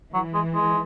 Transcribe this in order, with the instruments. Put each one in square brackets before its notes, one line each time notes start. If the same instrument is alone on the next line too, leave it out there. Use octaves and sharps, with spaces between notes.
[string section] E3 [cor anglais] F#3
[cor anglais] G#3
G#3